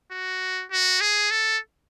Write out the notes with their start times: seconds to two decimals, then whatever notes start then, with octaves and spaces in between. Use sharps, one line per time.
0.12 F#4
0.71 F#4
1.01 G#4
1.31 A4